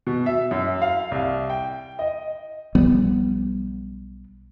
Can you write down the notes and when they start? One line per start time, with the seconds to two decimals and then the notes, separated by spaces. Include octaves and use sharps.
0.07 B2
0.26 E5
0.51 F#2
0.82 F5
1.11 C2
1.50 G5
1.99 D#5
2.75 B1 F3 G3 B3